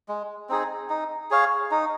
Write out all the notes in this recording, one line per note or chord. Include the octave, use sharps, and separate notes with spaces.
G#3
C4 D#4 G#4
D#4
G#4 C#5 F5
D#4